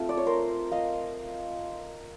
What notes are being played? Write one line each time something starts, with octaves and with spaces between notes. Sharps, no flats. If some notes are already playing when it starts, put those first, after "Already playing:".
Already playing: A3 C4 F4
D5
C#5
A#4 C5
D#5 F5